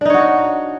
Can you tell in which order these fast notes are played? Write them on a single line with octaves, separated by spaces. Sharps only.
D4 D#4 C#5 F#4